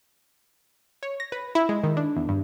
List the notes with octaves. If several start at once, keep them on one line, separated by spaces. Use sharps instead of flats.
C#5
A#6
B4
E4
G#3
D#3
D4
E2
G2